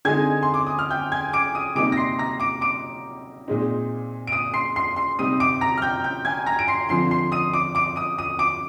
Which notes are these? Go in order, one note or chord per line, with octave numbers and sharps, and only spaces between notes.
D3 G#3 C4 D#4 G#5 G#6
C6
D6
D#6
F6
G5 G6
G#5 G#6
D6 D7
D#6 D#7
C3 G3 A#3 D#4 D6 D7
A#6
C6 C7
A#5 A#6
D6 D7
D6 D7
A#2 G#3 C4 D#4
D7
D#6 D#7
C6 C7
C6 C7
C6 C7
C3 G3 C4 D#4 D#6 D#7
D6 D7
A#5 A#6
F6
G5 G6
G5 G6
G#5 G#6
A#5 A#6
D7
C6 C7
D3 F3 C4 C6 C7
C6 C7
D#6 D#7
D6 D7
D6 D7
D#6 D#7
D#6 D#7
D6 D7